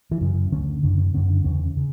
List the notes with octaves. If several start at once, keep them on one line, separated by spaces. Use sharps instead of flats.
E3
F#2 C#3 F#3
D2 D3 C#4
F#2 C#3 D4
C#4
F#2 D3 C#4
D4
E2 C#3 C#4
C#3